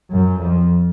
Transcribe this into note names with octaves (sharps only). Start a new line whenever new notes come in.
F#2
F2